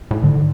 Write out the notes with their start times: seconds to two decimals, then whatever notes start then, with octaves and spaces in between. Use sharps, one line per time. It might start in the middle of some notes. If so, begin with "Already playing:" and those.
0.11 A2
0.22 G#2 D3